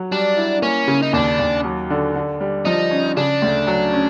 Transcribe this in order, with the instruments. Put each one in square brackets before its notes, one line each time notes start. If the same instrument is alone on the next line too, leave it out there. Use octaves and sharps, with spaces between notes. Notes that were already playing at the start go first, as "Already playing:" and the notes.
Already playing: [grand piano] F#3
[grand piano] G3 [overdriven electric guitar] D4
[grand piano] E4
[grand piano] A#3 [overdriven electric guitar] C#4
[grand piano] C#3
[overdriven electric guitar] D#4
[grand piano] D#2 [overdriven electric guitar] D4
[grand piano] D#2
F#3
D3
D3
G3
[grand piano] F3 [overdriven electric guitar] D#4
[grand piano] C#4
[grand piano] C#3 [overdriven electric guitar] D4
[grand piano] D2
F#3
C#4